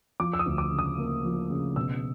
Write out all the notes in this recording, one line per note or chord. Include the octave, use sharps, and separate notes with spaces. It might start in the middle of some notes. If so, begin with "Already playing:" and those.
F3 D6
E6
D#6
D2
D6
C#3
D#6
A#3
F3
C#3
B2 E6